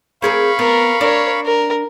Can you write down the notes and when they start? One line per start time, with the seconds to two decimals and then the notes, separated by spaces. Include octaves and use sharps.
0.22 C4 G#4 A#4 F5 B5 C#6
0.59 B3 A#4
1.01 D4 A#4 C#5 D5
1.45 A#4